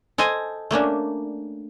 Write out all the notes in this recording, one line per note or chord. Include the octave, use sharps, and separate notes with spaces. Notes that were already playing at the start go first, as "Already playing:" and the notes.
A4 C5 D#5 G#5
A3 A#3 C#4 D4